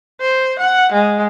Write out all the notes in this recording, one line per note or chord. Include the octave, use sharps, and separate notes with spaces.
C5
F#5
G#3